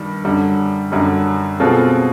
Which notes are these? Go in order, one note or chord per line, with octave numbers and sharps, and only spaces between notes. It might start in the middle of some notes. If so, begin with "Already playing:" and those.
Already playing: G2 D#3 G3
F#2 D3 G3
F#2 D3 G3
B2 G#3 C4 F4 A4